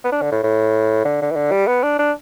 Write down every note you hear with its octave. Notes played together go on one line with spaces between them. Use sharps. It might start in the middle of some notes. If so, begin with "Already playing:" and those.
B3
D4
D3
A2
A2
D3
D3
E3
D3
G3
B3
D4
D4